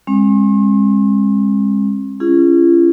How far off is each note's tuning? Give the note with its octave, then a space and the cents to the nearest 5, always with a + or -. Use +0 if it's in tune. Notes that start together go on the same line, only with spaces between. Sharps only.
G#3 -25 C4 +45
C#4 +0 F4 -45 G#4 -15